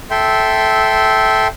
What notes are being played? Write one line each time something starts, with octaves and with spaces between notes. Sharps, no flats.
A4 E5 G5 C6